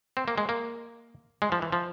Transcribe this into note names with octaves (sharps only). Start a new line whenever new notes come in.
C4
A#3
G#3
A#3
G#3
F3
E3
F3